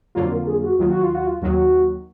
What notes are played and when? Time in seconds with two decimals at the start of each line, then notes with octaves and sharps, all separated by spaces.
0.15 F2 D3 F#3 A#3 F4
0.31 A#4
0.47 G#4
0.63 F#4
0.78 D#2 D#3 F#3 F4
0.91 F#4
1.03 F4
1.15 F#4
1.27 F4
1.42 D#2 D#3 F#3 F#4